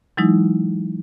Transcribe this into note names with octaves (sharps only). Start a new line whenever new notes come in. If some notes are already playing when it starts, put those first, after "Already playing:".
E3 F#3 G#3 D#4 E4